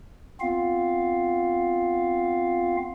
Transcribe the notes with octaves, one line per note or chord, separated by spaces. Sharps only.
B3 C4 F4 F5